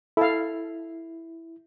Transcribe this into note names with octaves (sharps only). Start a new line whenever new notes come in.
E4 A4 F5